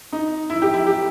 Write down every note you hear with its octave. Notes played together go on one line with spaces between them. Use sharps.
D#4
E4
G4
E4
G4